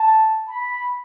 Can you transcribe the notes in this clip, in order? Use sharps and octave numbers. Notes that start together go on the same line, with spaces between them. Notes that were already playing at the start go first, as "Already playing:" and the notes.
Already playing: A5
B5